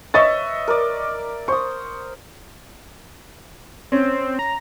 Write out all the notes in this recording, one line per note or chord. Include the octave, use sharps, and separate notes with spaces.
B4 C#5 D#5 E5 C#6 A6
A#4 D5
C5 C#6 D#6
C4 C#4
A#5